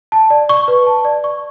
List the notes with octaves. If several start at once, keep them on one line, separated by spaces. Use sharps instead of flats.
A5
D5
C#6
B4
A5
D5
C#6